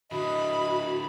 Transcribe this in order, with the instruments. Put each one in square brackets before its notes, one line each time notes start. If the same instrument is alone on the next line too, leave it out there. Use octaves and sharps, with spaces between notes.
[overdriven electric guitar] D3 E4 [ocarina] F#4 [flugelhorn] D#5 [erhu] B5